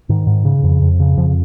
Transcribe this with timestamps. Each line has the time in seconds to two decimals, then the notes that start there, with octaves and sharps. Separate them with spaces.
0.09 G#2 D#3
0.27 G#2
0.45 C#3
0.63 F2
0.82 F2
1.00 C#3
1.17 F2 F3